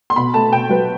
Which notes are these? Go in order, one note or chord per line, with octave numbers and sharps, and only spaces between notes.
C6
B2 B5
A3 A5
B2 G5
F#3 B4